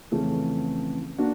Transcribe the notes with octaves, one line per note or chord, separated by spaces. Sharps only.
F2 C#3 E3 A3 C#4
A#3 D4 F#4